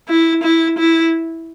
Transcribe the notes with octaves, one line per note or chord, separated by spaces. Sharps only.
E4
E4
E4